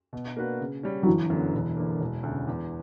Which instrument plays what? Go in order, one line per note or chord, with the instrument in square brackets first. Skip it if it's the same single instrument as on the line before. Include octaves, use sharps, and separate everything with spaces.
[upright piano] B2
A#3 D4 F#4 B4
C#3
G3 C#4
[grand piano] F#3
[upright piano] G1 [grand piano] E3
[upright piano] F#2 D3 F#3 B3
E1
E2 D3 A#3
E1
D2
C#3
E2